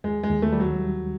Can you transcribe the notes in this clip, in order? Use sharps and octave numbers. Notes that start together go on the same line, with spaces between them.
D#2 G#3
G#3
D#2
A3
D#3 G3
F#3
G3